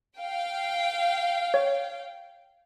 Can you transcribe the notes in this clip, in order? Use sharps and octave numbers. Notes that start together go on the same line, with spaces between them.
F5 G5
C#5